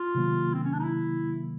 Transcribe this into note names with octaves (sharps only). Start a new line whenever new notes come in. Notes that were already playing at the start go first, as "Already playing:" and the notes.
Already playing: F4
C3 D#3 F#3 A#3
C4
C#4
D4
D#4
E4